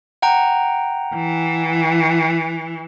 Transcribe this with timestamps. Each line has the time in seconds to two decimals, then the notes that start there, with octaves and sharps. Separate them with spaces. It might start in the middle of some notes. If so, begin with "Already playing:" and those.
0.22 F#5 G5 A#5
1.15 E3